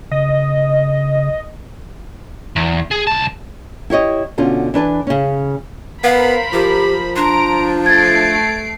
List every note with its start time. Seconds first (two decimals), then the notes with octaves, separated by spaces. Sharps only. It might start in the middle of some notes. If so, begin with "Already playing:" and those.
0.11 C#3 D#5
2.56 E2
2.91 G#4
3.07 C2 A5
3.90 E4 G4 C#5 D#5
4.38 B2 D3 C#4 F4
4.74 E3 D4 B4 A5
5.07 C#3 C#4
6.04 B3 A#4 C5 F5 B5
6.53 F3 G4
7.16 D4 A#5 C6 D7
7.86 A3 G#6 A6 C7 D7